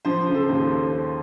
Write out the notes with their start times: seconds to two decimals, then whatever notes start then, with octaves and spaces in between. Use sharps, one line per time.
0.05 F3 C5
0.27 C#3
0.34 A4
0.49 D#2